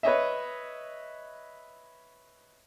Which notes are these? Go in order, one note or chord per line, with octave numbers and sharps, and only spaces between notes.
B4 C#5 D#5 E5